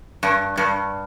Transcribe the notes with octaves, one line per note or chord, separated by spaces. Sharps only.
G2
G2